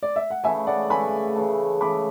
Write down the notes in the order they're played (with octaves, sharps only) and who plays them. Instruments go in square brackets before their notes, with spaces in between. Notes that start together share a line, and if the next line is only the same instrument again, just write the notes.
[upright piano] D5
E5
F#5
[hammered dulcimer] C#3 E3 A3 [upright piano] E5 G#5
[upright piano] D5 F#5
[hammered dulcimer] C#3 E3 A3 [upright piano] G#5 B5
[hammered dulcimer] C#3 E3 A3
[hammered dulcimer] C#3 E3 A3 [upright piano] B5 D6